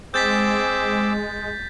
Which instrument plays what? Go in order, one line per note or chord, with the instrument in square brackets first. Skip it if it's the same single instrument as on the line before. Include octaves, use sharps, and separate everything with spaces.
[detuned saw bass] G#3 [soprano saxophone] C4 [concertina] G#4 D6 E6 [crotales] G6 A6 B6